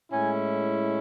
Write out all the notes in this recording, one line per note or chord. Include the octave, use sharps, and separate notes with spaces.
A2 G#3 C#4 E4 G#5